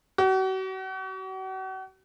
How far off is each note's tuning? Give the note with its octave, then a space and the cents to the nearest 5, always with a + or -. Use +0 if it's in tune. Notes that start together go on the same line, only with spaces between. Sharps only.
F#4 +40